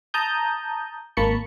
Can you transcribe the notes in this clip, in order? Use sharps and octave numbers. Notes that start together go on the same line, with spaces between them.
A5 A#5 D#6 G6
G#1 A#3 A5 B5 C#6 C#7